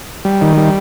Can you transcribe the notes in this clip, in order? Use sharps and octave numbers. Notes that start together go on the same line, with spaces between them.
G3
D#3
G3